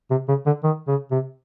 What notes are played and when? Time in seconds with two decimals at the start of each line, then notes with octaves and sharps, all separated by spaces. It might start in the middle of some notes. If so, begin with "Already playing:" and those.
0.10 C3
0.28 C#3
0.46 D3
0.64 D#3
0.88 C#3
1.11 C3